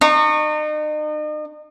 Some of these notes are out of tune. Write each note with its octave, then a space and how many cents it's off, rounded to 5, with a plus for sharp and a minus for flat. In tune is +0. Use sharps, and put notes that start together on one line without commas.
D#4 -40 C#6 +0